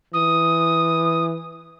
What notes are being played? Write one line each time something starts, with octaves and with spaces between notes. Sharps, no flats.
E3 D#6